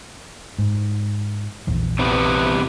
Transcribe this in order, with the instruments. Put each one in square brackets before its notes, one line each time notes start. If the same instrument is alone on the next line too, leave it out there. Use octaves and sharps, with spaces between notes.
[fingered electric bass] G#2
A#1 E2
[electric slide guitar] C3 E3 B3